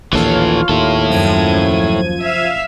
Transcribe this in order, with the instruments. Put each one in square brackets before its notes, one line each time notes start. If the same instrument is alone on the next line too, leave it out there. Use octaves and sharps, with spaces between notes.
[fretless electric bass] A#1 D#2 [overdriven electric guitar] E3 A4 [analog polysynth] F4 C#5 F5
[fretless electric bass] D#2 [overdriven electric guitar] E4 A4
[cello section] F#2 [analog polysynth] F3 G#6 D#7
[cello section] E5 F5